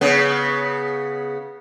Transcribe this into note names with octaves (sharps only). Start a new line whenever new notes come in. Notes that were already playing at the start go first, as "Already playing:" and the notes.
C#3 B3